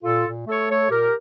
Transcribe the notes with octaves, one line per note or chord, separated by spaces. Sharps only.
A#2 F4 A4
A#2
A3 A4 C#5
A3 A4 C#5
A#2 G4 A#4